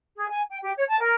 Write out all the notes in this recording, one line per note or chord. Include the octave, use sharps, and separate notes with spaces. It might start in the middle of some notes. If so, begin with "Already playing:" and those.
G#4
G#5
G5
G4
C#5
A5
A#4